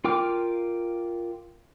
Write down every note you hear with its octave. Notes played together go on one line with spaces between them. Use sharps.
F4 A#4 G5 D6 F6